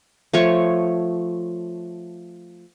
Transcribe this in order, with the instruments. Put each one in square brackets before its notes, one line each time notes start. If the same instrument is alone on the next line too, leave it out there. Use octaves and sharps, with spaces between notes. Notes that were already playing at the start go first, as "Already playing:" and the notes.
[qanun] F3 A3 C#5 C#6